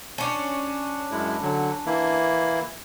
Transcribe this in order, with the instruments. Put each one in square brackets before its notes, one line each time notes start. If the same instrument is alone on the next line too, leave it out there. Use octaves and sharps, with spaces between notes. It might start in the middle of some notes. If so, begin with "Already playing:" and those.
[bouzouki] C#4 D4
[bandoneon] F#2 G#3 E4
D3 F#3
E3 A#3 E4